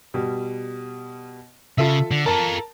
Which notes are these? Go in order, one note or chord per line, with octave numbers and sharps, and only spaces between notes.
B2 G3
C#3 F4 A4 E5
D3
F4 A4 A#4 A5